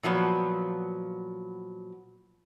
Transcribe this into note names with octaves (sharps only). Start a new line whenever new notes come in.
A#2 F3 F#3 B3